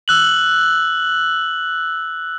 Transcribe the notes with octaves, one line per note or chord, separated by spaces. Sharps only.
E6 F#6 F#7